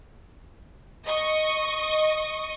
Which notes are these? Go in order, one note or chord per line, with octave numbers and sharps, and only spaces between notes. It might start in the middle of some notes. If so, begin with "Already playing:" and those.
D#5 C#6 D#6